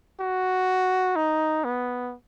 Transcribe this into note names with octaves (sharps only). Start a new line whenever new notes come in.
F#4
D#4
B3